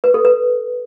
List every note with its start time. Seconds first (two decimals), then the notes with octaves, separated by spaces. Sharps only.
0.04 B4
0.14 A4
0.25 B4